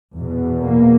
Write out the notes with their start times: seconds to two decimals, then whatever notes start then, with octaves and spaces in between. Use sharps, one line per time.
0.17 E2 B2
0.64 A#3